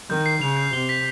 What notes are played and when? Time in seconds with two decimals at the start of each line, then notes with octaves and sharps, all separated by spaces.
0.09 D#3 G6
0.26 C7
0.41 C#3 F7
0.57 G6
0.73 C3 G7
0.89 B6